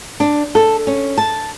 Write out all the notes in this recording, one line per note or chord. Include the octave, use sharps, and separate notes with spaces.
D4
A4
C#4
A5